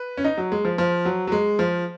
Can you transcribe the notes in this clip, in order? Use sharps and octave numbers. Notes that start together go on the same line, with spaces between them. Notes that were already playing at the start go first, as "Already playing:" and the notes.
Already playing: B4
C#4
D#4
F#3
G#3
F3
F3
F#3
F#3
G#3
F3